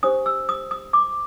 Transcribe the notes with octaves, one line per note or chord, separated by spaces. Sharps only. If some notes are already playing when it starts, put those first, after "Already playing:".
D4 G4 C5 D#6
E6
D#6
D#6
D6